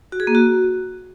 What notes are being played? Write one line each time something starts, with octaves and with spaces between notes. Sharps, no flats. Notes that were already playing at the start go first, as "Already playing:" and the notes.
F#4
G#4
A#3
F#4